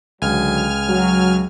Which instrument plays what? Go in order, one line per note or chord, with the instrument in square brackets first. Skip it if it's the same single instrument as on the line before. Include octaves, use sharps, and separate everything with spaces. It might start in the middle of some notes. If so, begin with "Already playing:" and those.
[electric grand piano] C#2 [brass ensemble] D3 F#3 [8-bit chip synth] G#5 F6
[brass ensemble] F#3